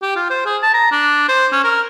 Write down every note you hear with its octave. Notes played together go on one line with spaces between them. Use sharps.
G4
F4
C5
G#4
A5
A#5
D4
C5
C#4
A#4